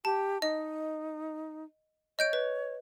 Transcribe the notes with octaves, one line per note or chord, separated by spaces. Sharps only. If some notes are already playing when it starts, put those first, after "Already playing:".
G4 A5
D#4 D#5
C#5 D#5 G6 D7
B4